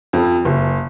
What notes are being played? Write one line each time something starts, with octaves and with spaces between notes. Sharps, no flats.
F2
F#1